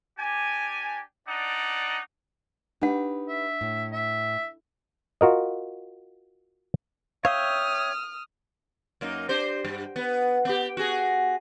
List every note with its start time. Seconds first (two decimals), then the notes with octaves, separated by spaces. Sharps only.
0.17 D4 G4 G#5
1.27 D4 D#4 D5 F#5
2.82 D4 D#4 G4 B4 F#5
3.29 E5
3.61 A2
3.92 E5
5.21 F4 F#4 A#4 D#5
7.25 C#5 E5 F5 G5 D#6 F6
9.01 F#2 A#3 D#4
9.29 D4 G4 C5
9.65 G2
9.96 B3 B4
10.45 B3 G4
10.77 F#4 G#4